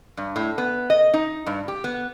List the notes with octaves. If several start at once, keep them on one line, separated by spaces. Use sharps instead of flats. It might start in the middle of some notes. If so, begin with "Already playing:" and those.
G2
A2
B3
D#5
D#4
G2
G4
B3